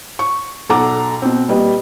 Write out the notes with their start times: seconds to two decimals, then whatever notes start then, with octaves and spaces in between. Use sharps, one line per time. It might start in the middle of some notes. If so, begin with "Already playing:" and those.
0.19 C#6
0.69 B1 A4 F#5 A#5 D6
1.22 B2 C4
1.48 A#2 G3 B4 D#5